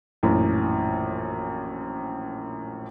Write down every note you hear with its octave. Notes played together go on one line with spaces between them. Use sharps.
A#1 F#2 A2 E3